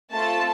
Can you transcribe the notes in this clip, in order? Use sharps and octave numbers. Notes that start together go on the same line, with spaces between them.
A3 C4 F4 A4 A5